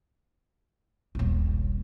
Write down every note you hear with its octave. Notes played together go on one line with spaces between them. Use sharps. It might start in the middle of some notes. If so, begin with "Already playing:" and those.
D#1 A#1